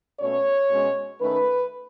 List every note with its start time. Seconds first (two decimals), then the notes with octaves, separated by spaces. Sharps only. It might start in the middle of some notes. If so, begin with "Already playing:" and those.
0.20 B2 A3 C#4 C#5
0.70 B2 G#3 C#4
1.20 D#3 A3 C#4 B4